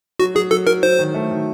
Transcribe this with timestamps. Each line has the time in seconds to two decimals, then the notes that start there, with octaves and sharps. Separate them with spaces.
0.20 F#3 F#4
0.35 F#3 G#4
0.51 F#3 A4
0.67 F#3 A#4
0.83 F#3 C5
0.99 D#3
1.14 A3
1.31 D#3